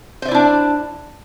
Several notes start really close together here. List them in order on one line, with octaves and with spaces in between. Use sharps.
C5 E5 D5 E4 D4